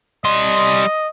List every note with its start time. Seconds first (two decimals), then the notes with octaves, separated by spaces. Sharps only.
0.25 G3 D#5 C6